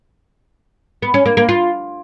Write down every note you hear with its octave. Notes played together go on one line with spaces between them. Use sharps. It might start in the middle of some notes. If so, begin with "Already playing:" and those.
B3
C#4
A#3
A#3
F4